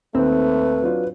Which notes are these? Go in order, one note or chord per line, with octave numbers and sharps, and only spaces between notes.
D#2 A3 C4 B4
F#3 D4 F4